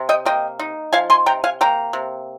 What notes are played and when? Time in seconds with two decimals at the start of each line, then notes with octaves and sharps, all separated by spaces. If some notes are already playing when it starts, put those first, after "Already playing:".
Already playing: C3
0.09 D#5 G5
0.25 A#3 D#5 G5
0.59 D#4
0.93 F3 F5 G#5
1.10 G#5 C6
1.26 C3 G5 A#5
1.44 F5 G#5
1.61 A#3 G5 A#5
1.93 C3